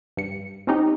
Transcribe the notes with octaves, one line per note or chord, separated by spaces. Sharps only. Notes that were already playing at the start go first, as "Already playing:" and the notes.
G2 C#7
C4 C#4 D#4 G4